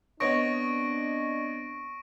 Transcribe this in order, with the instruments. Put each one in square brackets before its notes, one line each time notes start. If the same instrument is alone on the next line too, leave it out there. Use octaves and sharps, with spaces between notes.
[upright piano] B3 C#5 D#5 [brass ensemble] C4 D4 [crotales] C#6 A#6 D7